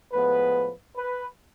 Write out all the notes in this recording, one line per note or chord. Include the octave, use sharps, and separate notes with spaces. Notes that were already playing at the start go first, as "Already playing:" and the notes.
A2 F3 G#3 B3 B4
B4